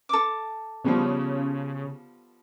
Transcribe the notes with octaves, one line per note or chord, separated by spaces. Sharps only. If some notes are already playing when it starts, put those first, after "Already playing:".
A4 D6
C#3 F3 G3 B3